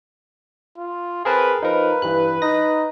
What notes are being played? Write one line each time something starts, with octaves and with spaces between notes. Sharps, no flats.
F4
C4 G#4 A#4 B4 A5
F3 D#4 A#4 B4
G2 E3 F#6
D#4 A#6